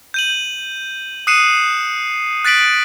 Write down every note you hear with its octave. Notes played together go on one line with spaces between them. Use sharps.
G6 D#7 F#7
D#6 F#6 C7 C#7 D#7 E7
F#6 A6 B6 D7 F#7